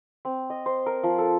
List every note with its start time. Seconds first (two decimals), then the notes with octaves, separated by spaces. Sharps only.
0.25 C4
0.50 D#5
0.66 C5
0.86 A#4
1.03 F3
1.18 A4